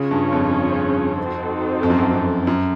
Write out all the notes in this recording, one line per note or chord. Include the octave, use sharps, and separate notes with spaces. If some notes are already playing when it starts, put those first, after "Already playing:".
Already playing: C#3 C#4 F4 G#4 C#5
G2
F2
C4 D#4 F#4 A4 C5
F2
F#2
F2
F2
F#2